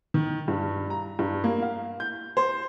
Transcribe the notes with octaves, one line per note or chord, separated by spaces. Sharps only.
D#3
G2
A#5
G2
A#3
F5
G6
C5